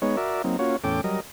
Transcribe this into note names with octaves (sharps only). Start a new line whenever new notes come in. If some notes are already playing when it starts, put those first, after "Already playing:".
G#3 B3 D#4 C#5
F#4 A#4 D5 E5
F#3 A#3 C4 D#4
A#3 C#4 F4 F#4 C#5
E2 A2 C#4 A4 G5 D6
F#3 G3 A#4 D#5